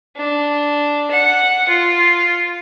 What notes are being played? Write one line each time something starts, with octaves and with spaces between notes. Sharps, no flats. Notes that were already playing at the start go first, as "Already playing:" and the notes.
D4
F#5
F4